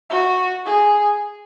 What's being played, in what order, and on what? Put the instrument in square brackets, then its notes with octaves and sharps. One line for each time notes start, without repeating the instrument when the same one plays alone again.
[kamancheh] F#4
G#4